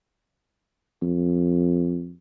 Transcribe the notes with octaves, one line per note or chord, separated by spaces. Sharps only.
F2